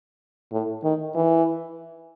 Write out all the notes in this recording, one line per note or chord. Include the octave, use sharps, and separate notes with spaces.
A2
D#3
E3